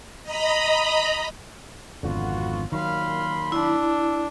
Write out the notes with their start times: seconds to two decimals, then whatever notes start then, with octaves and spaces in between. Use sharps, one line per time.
0.23 D#5 A#5 B5
2.03 G#1 F2 D3 B3 F4 F#4
2.72 A#2 D#3 F#3 F5 B5 C6
3.52 D4 E4